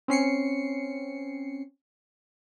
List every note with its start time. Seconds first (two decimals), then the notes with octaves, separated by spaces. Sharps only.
0.08 C4 C#4 C7 C#7